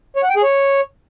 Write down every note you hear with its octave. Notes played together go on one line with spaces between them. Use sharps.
C#5
F#5
G5
G#4
C#5